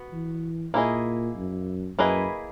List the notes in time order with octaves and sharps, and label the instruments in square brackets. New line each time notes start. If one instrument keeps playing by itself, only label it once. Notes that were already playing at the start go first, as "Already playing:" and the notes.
Already playing: [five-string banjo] B3 F#4
[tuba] E3
[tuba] A#2 [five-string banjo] A#3 E4 G#4 D#5
[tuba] F#2
[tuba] F#2 [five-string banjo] A#3 E4 G#4 B4 D#5